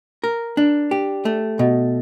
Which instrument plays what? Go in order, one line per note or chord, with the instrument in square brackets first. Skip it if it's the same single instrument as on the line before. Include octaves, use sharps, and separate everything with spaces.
[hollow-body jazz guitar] A#4
D4
G4
A3
B2